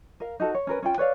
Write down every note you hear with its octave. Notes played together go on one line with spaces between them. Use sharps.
A#4 F5
D#4 F#4 A4
C#5
C#4 A#4 B4
C#4 F4 G5
B4 C#5 D5 F5